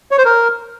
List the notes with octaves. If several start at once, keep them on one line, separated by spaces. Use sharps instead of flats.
C#5
C5
A#4